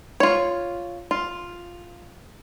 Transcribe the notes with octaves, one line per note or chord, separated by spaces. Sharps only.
F4 C#5
F4